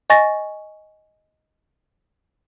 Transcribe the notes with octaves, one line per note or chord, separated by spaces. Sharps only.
D#5 G#5 C#6 A6 A#6